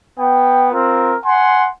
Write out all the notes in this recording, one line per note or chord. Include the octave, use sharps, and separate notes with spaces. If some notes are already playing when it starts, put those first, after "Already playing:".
B3 G5
C4 F4 A#4
F#5 G#5 C6